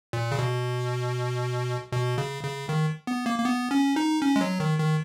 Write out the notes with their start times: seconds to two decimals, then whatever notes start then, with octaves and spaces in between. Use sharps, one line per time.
0.13 A#2
0.32 C#3
0.39 B2
1.92 B2
2.18 C#3
2.43 C#3
2.69 D#3
3.07 B3
3.26 A#3
3.38 A#3
3.45 B3
3.71 C#4
3.96 D#4
4.22 C#4
4.36 G#3
4.41 F#3
4.60 D#3
4.79 D#3